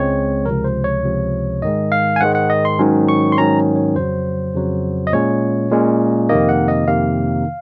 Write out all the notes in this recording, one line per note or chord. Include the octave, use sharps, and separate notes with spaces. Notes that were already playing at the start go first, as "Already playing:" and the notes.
Already playing: C#2 C#3 G#3 C4 C#5
C#2 C3 F3 A#4
C5
C#5
C#2 C3 F3
G#2 D#3 G#3 D#5
F5
G#5
G#2 D#3 G#3 F#5
F#5
D#5
C6
G#2 D#3 F#3 C#4
C#6
C6
G#2 D#3 F#3 C#4 A#5
C#5
F2 C#3 F#3 C5
F2 C#3 F#3
D#5
A#2 G#3 C#4 C#5
A#2 G#3 C#4
F2 C3 D#3 A#3 D#5
F#5
D#5
F2 C3 D#3 A#3 F5